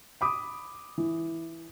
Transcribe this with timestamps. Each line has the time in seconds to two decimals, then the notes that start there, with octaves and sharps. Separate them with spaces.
0.21 B5 D6 D#6
0.98 E3